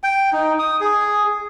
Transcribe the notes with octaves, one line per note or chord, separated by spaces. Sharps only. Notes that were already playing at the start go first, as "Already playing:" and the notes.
G5
D#4
D#6
G#4